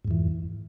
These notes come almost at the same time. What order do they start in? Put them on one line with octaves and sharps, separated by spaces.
G#2 F2 E3